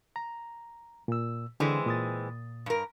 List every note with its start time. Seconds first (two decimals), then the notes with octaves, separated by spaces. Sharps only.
0.16 A#5
1.08 A#2 E6
1.60 D3 E3 G#3 C4
1.87 A#2 D#6 A6
2.66 G2 A#4